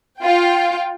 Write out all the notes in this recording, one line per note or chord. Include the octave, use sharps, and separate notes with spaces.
F4 G5